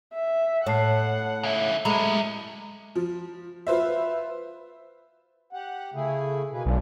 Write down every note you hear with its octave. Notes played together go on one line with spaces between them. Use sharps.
E5
A2 C#5 F#5 A5 C7
C#3 E4
F#3 G#3 A3 E4 B5
F3
F4 B4 C5 E5
G4 F#5
C#3 A3 E4 G#4
B2 A#3 G#4 B4
B1 A3 A#3 D4